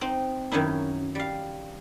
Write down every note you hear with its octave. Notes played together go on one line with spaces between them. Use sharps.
C4 D#4
F#2 D#3 C#4 D#4 E4
G3 F5